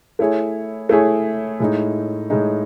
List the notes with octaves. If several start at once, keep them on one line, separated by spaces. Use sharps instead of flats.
A3 E4 G#4 C#5
A3 E4 G#4 C#5
A2 G#3 D#4
A2 G#3 D#4